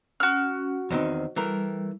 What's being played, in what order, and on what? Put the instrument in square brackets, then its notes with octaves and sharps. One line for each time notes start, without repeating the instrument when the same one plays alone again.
[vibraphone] C#4 [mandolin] F#4 F6
[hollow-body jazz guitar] E2 D#3 C4 [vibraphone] C5 D#5
[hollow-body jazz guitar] E3 A3 A#4 [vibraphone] G3